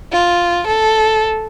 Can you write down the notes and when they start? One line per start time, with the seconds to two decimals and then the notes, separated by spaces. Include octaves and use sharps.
0.12 F4
0.67 A4